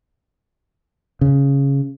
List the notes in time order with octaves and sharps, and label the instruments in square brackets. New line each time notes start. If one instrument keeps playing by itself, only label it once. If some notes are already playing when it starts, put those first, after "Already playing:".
[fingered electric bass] C#3